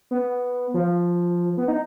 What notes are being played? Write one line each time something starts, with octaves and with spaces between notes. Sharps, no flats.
B3
F3
B3
D#4